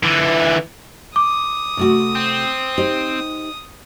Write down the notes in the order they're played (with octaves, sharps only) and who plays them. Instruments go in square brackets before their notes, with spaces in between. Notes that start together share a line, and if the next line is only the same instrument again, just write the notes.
[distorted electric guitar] D3 E3
[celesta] D6 [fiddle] D#6
[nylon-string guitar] C3 A3 F#4
[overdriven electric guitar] C4
[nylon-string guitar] D#4 G4 C5